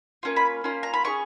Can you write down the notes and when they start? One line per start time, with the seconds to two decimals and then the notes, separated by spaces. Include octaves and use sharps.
0.23 A#3 C#4 F4
0.36 B5
0.64 A#3 C#4 F4
0.83 A#5
0.94 B5
1.04 C#4 G#4 C#6